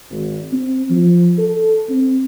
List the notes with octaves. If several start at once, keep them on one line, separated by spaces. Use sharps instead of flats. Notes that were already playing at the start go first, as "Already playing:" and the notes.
G#1
C4
F3
A4
C4